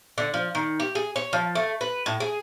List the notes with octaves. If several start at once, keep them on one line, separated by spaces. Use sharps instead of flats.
D3
F3
D#3
G4
G#4
C#5
F3
A3
B4
A2
G#4